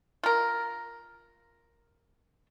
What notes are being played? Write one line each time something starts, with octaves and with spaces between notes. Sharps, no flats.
F4 A#4